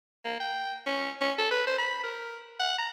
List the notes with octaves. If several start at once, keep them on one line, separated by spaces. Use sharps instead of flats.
A#3
G5
C#4
C#4
A4
B4
C5
B5
A#4
F#5
A#5